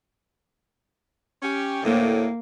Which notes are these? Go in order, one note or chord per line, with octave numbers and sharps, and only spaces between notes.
C#4 G4
D2 A2 A#3